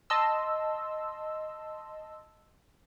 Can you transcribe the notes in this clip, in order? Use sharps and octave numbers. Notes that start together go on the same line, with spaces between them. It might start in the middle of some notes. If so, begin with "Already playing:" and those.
D#5 A5 C6 E6